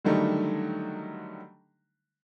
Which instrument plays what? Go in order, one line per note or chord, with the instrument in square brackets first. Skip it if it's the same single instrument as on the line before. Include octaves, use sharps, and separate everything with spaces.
[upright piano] D3 D#3 F#3 G3 A3 D#4